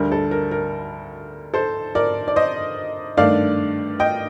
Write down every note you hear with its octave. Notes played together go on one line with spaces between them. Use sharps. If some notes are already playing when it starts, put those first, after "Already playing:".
Already playing: D2 D3 G3 A#4
A4
A#4
A#4
A4 C5
A#4 D5
D5
C5 D#5
G2 D#3 A3 D4 D5 F5
D#5 G5